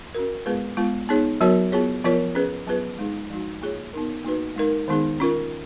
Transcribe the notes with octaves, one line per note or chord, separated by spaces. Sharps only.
C#4 F#4 A#4
G#3 B3 F4 G#4 B4
G#3 B3 F4
B3 D#4 G#4 C#5
F#3 B3 F#4 A#4 C#5
B3 F4 G#4 C#5
F3 B3 F4 A#4 C#5
C#4 G#4 B4
F#3 B3 F4 G#4 B4
G#3 D#4 G#4
F3 G#3 D#4 F#4
A#3 F4 G#4 C#5
B3 D#4 A#4
A#3 D#4 F#4 B4
G#3 D#4 A#4
D#3 G#3 B3 D#4 G#4
C#4 F4 A#4